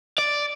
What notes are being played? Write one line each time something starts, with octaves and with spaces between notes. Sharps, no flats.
D5